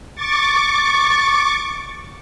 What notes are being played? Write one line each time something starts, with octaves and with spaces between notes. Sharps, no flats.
C#6 D6 A6